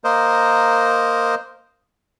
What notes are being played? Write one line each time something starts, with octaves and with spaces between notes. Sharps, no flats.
A#3 A#4 C5 D#5